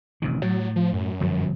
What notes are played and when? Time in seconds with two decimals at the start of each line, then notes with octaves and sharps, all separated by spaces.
0.22 A1 C3 D#3
0.42 A2 F#3
0.76 F3
0.93 F#2
1.20 G1 F3 F#3